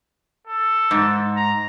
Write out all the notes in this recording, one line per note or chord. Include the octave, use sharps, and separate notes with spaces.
A4
G#2
A#5